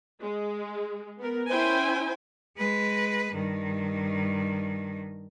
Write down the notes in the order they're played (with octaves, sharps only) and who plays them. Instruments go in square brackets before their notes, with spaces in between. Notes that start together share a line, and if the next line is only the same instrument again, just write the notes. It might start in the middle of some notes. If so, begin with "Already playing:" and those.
[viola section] G#3
B3 A#4
C#4 E4 C5 G5 G#5
[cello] G#3 B4
G2 D#3